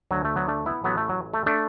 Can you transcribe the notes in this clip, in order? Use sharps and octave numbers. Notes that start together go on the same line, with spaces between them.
D2 D3 F#3
A3
F#3 B3
A3 D4
B3 E4
A1 A2 E3 F#3 B3
A3
F#3
A3
A3 D4